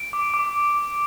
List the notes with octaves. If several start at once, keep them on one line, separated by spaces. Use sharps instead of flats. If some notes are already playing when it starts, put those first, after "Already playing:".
Already playing: D7
D6
D6